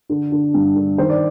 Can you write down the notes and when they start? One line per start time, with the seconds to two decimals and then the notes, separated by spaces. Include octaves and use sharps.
0.09 D3
0.32 D3
0.54 G2
0.76 D3
0.98 D#3 C5
1.09 D5